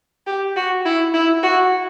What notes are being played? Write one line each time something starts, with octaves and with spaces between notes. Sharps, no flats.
G4
F#4
E4
E4
F#4